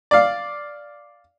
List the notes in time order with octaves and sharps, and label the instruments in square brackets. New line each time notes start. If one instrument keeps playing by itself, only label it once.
[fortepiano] D5 F5